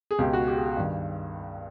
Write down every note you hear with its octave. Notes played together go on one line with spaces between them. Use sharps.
G#4
C#2 B2 G4
F#4
G4
G#4
G#4
G2 D#3